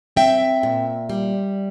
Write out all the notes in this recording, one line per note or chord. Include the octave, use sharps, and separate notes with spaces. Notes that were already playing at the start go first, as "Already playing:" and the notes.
C4 E5 G5
A#2
G3